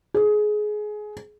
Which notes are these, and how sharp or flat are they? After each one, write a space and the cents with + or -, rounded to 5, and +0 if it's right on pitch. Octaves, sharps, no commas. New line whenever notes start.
G#4 +20